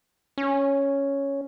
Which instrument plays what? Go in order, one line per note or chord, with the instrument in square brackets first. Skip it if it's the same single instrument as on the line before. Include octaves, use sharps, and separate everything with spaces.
[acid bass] C#4